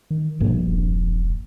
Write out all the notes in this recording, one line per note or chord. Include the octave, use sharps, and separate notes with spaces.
D#3
A#1 G2 B2 A#3
E1